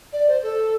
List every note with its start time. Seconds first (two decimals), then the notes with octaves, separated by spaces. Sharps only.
0.13 D5
0.28 C5
0.43 A4